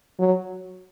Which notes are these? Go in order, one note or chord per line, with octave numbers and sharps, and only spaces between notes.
F#3